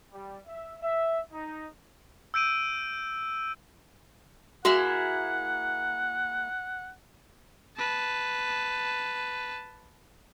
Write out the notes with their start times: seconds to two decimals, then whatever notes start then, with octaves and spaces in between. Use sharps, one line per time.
0.12 G3
0.47 E5
0.82 E5
1.32 D#4
2.34 E6 G6 D7 D#7
4.65 A#3 E4 F#4 G#4 F#5
7.78 B4 A5